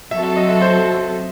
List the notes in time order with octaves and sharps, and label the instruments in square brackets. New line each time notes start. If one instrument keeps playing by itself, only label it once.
[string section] F#3 C4 F#4 A4 [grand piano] E5
[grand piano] E5
D#5
E5
C5